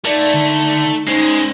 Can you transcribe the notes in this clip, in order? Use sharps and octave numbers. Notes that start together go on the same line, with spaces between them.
A3 D#4 A#4 D5
D3
G#3 C#4 D#4 C5